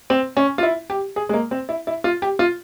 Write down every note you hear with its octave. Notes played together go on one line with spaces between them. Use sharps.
C4
C#4
F4
E4
G4
G#4
G#3
A#3
C4
E4
E4
F4
G4
F4